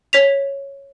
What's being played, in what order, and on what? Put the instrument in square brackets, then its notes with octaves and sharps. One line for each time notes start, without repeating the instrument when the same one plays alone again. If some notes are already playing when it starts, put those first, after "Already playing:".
[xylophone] C#5 B6 F7